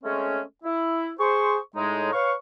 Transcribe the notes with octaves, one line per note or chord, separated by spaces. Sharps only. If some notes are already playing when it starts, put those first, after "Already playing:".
G#3 A3 C4 C#4
E4
G#4 C5 C#6
A2 G#3 D#4
B4 C#5 F5 C#6